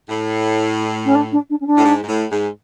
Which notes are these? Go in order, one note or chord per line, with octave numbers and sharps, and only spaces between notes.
A2
C#4
D4
D4
D4
C#4
D4
A2
G#2
G#2
A2
G#2